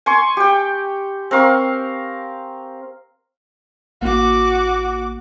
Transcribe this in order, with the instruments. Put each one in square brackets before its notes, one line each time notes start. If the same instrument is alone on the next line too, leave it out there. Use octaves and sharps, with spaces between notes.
[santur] G#5 C6 C#6
G4 G5
C4 A#4 F5 C#6
[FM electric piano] A1 A#3 F#5 [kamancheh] F#4 D6